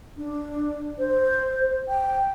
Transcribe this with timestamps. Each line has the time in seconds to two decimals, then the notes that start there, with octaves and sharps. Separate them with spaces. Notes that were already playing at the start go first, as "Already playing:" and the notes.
0.17 D4
0.99 C5
1.88 G5